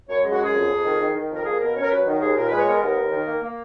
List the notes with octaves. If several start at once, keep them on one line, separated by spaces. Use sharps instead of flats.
F#2 C#5
G#3
F#4
F#2 G#4
F2
F2
D#3
D#3
D#3
F2 A#4
A#3 G#4
B2 A#4
C#4 C#5
A#4
F#3 B4
D#3
D#2 G#4
A#2 A#4
B4
G#3
C#5
B3 A#4
D#2 A#4
D#2
D#3
A#3
A#3